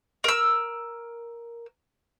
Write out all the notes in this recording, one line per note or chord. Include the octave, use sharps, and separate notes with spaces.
A#4 E6